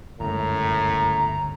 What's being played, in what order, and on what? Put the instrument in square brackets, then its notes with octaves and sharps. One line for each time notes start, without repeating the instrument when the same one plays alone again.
[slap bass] G1 C#2 [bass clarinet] F#2 [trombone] A2 [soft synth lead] A#5